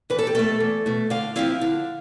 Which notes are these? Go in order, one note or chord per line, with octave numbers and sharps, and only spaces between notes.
E2 B4
A4
G4
B2 A3 A4
E2
B2 A3
D3 F5
F3 C4 E4 F5
D3